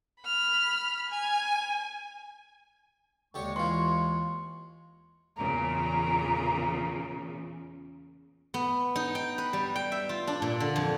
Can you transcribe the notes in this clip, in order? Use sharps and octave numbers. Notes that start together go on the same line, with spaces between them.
B5 F6
G#5
D#2 D3 G#3 G4 C#5 C#6
E3 F4 C6
E2 A#2 C#3 A#5
B3
D#4
G5
B4
G3
G5
E5
F4
D4
A#2
D3
F2